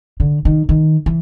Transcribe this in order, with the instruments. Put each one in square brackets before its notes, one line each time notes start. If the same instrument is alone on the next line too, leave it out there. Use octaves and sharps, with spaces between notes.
[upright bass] D3
D#3
D#3
E3